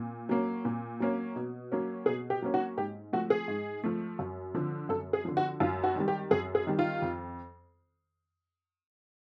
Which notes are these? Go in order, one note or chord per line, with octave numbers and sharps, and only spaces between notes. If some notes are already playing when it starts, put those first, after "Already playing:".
Already playing: A#2
F#3 A#3 C#4
A#2
F#3 A#3 C#4
B2
F#3 A#3 C#4
B2 G#4
G4
F#3 A#3 C#4
F#4
G#2 G4
F3 A3 F#4
G#4
G#2
F3 A3
F#2
D3 F3
F#2 A4
G#4
D3 F3
F#4
F#2 F4
F#4
D#3 G3
G4
F#2 G#4
G#4
D#3 G3
F4
F2